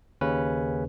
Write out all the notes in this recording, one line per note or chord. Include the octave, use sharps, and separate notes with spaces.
D#2 C#3 C#4 B4